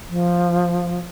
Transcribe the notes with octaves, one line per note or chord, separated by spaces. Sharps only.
F3